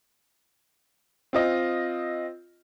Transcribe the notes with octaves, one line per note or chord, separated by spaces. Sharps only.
C4 F4 D#5